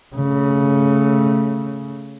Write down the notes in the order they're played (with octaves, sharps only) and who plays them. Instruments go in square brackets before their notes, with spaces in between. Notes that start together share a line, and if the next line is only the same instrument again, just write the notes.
[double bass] C#3 A3